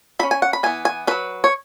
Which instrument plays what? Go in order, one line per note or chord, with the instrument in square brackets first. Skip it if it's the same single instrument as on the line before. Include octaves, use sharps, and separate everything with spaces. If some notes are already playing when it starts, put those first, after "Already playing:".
[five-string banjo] F#3 C#4 B5
G#5
F#5
B5
E3 B3 G#5
G#5
F#3 C#4 B4
C#5